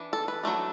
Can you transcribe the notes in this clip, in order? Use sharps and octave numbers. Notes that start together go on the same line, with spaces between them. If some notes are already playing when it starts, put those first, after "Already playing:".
Already playing: E3 D4
A4
B4
F#3 A3 D4